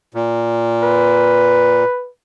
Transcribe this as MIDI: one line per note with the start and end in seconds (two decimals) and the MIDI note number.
0.14 1.84 46
0.83 2.09 71